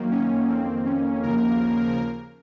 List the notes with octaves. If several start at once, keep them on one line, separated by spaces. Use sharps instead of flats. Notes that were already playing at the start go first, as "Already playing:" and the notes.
Already playing: F#2 D#3 A#3
C#4
F2 D#3 A#3 C4
C#4
D#2 C#3 F3 A#3 A#4